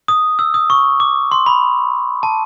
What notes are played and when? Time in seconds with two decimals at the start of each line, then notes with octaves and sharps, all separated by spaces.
0.08 D#6
0.39 E6
0.54 D#6
0.70 C#6
1.00 D6
1.32 C6
1.46 B5
2.23 A5